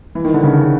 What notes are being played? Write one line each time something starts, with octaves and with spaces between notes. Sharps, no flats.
E3
D#3
D3
C#3